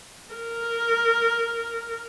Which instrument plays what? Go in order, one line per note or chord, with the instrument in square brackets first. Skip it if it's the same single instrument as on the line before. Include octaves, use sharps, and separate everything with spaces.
[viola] A#4